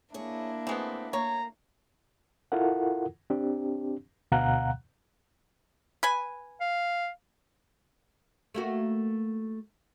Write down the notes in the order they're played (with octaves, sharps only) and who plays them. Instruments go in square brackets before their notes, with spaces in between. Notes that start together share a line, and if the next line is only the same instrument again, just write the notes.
[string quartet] A#3 D4 E4 [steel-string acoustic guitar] G#4 C#5
[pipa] E3 G#3 B3 [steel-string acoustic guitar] A3 C4
[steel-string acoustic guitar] A#3 [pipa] C#5 [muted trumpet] A#5
[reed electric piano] E4 F4 A4 A#4 F#5
C4 D4 G4
D2 B2 F5 F#5 A#5 F#6
[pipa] B4 G#5
[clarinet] F5
[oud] A3 A#3 F#4